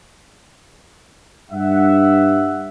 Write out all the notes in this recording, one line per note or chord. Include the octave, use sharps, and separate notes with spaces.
G2 E5 F#5